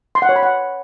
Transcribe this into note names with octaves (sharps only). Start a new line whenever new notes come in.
C6
F#5
C#5
B5
F#5